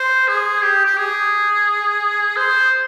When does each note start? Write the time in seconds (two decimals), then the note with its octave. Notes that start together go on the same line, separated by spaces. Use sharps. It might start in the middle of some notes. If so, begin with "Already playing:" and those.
Already playing: C5
0.28 G#4
0.63 G4
0.85 G4
0.98 G#4
2.37 C5